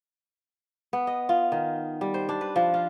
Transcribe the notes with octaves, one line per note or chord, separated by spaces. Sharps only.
B3
D#5
F4
D#3
G3
C5
D4
B4
F3
F4